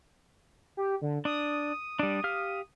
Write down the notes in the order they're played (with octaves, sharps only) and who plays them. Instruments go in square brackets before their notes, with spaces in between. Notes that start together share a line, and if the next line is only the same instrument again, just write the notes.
[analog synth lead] G4
D3
[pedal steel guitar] D4 [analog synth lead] D#6
[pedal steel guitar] G3 D4
G4 F5 F6